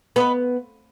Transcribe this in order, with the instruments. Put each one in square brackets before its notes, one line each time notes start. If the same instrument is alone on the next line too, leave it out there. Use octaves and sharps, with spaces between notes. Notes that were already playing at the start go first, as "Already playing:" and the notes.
[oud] B3 [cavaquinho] B4 D#5 B5